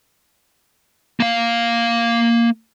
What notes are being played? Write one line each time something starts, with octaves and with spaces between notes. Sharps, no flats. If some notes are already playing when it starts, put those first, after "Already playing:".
A#3 F5